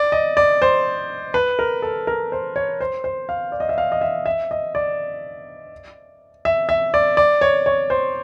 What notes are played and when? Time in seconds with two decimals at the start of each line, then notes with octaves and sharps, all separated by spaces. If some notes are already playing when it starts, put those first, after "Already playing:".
Already playing: D5
0.12 D#5
0.37 D5
0.62 C5
1.34 B4
1.59 A#4
1.82 A4
2.07 A#4
2.32 C5
2.56 C#5
2.81 C5
3.04 C5
3.29 F5
3.52 D5
3.60 D#5
3.69 E5
3.78 F5
3.92 D#5
4.01 E5
4.26 E5
4.51 D#5
4.75 D5
6.45 E5
6.69 E5
6.94 D5
7.17 D5
7.41 C#5
7.66 C#5
7.90 C5